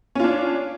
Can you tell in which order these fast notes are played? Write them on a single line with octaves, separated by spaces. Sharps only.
C#4 F4 D4